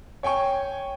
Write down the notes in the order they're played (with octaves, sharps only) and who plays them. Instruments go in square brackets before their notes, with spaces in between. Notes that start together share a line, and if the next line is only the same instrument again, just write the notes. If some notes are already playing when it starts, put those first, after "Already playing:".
[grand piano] C#5 G5 G#5 C#6